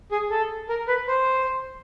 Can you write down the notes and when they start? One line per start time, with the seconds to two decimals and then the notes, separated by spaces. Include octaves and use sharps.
0.11 G#4
0.30 A4
0.69 A#4
0.88 B4
1.08 C5